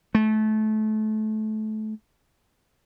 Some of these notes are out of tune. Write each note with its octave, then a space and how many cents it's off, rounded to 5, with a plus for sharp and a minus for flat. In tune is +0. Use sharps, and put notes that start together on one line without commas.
A3 -25